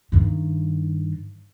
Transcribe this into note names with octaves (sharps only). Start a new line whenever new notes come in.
G2 D#3